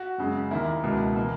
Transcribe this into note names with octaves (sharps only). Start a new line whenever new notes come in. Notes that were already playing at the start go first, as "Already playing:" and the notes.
Already playing: F#4
F#2 C#3 G#3
D#2 D#3 A#3 E4
C#2 B2 A#3
E3 A#3